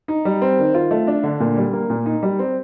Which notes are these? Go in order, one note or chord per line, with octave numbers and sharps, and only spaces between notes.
D#4
G3
C4
D#3
F4
A3
D4
D3
A#2
G3
A#3
A#2
D#4
G3
C4